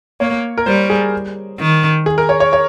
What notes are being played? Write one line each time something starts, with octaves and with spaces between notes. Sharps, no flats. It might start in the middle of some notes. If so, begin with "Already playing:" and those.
A#3 C#5
A#4
G3 C5
G#4
D#3
G#4
A#4
C#5
C#5
C#5